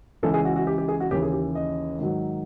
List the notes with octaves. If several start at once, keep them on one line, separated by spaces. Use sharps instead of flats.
C#2 C#3 E3 A4
G#4
F#4
F#4
G4
G4
G#4
F#4
D#2 C#3 E3 G4
G#4
G4
D#5
G#2 D#3 F#3